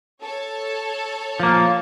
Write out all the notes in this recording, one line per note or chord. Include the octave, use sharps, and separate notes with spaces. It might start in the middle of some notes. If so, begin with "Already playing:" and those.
A4 C#5
F3 A#3